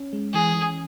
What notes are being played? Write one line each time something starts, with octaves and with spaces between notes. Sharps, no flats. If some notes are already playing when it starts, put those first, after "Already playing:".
Already playing: C#4
G#3
E3 G#4
E3